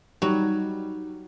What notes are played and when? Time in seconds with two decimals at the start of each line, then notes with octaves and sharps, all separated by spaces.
0.22 F#3 G3 D#4